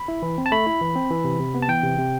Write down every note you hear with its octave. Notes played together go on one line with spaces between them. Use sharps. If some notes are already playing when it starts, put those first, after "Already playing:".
Already playing: B5
E4
E3
C4
A5
A3 B5
E4
E3
C4
E3
C3
C3
B3
A5
E3 G5
C3
C3